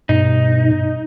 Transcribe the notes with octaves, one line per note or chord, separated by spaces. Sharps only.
G2 B2 D#4